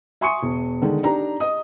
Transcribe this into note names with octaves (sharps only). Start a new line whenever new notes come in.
E5 G#5 C6 C#6 D#6 C#7
E1
D3 D#3 G#3
D4 D#4 G4 A#5
D#5 D#6